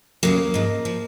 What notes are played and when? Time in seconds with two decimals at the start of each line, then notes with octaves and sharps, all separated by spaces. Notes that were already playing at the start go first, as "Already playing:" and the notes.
0.23 D#2 C#3 F#3 A#3
0.54 G#2 F3
0.85 F3